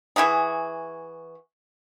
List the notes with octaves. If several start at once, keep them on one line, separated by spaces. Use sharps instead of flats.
E3 E4 F#4 G#4